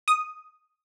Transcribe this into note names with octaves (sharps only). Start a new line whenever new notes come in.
D#6